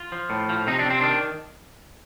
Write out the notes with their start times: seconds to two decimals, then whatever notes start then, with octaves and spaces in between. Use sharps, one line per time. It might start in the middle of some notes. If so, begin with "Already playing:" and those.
Already playing: F4
0.12 F3
0.30 A2
0.49 F3
0.67 C3 D#4
0.79 D4
0.85 C3 C4
1.01 D#3 D4